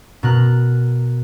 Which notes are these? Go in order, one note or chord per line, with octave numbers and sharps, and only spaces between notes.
B2 A#4 F#6